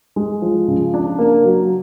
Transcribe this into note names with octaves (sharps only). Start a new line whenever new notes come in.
G#3
F3
C#3
D4
A#3
F#3